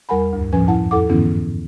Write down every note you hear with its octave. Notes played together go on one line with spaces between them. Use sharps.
E2 G3 A#4 F#5 G#5 B5
D2 G2
F#2 A2 F3 C#4 B4 G#5
E4 F#5 A5
F2 E4 A4 F#5 D6
G#2 D3 E3 B3 C#4 E4